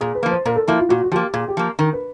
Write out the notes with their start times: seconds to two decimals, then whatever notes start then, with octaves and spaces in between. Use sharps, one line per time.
0.01 A#2 G#4
0.15 B4
0.23 F3 A#3
0.31 C5
0.45 A#2 A#4
0.56 A4
0.68 F3 A#3 E4
0.79 F4
0.89 A#2 F#4
1.04 F#4
1.12 F3 A#3 G4
1.33 A#2 G#4
1.48 G4
1.57 F3 A#3
1.79 D#3 A#4
1.93 B4